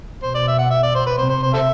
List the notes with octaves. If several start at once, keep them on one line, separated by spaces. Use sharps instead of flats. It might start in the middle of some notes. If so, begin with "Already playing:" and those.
B2 C5
D5
E5
F#5
E5
D5
C5
B4
C3 C5
C5
C5
A4 C5 E5